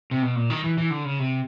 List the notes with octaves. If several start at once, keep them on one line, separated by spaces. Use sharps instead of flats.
C3
B2
A#2
D#3
E3
E3
D3
C#3
C3